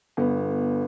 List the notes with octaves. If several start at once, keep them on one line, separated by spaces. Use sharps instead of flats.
G1 B3